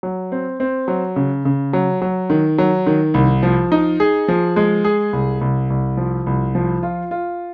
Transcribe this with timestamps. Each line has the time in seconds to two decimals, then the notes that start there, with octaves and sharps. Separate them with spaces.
0.03 F#3
0.32 C4
0.60 C4
0.88 F#3
1.16 C#3
1.45 C#3
1.73 F#3
2.02 F#3
2.30 D#3
2.58 F#3
2.87 D#3
3.14 C2
3.43 F3
3.72 D#4
4.00 G#4
4.28 F3
4.56 G#3
4.84 G#4
5.13 C2
5.41 C2
5.70 C2
5.97 F3
6.26 C2
6.55 F3
6.83 F4
7.11 F4